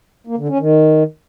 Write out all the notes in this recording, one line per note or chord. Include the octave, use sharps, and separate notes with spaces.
A#3
D3
C#4
D#3